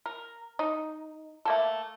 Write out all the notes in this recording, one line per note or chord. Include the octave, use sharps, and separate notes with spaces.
A#4
D#4
A3 A#3 A4